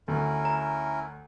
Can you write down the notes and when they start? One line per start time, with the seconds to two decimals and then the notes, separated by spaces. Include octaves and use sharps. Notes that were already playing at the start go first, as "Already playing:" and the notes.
0.08 D2 C#4 E4 A#4
0.45 A#5